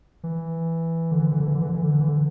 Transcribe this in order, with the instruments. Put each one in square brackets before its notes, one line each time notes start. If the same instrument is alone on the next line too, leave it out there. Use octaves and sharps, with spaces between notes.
[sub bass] E3
D3
E3
D3
E3
D3
E3
D3
E3
D3
E3
D3
E3
D3